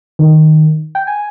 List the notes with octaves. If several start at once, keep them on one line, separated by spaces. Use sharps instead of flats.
D#3
G5
G#5